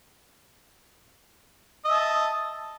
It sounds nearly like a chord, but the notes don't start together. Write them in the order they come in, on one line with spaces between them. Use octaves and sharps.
D#5 E5 A5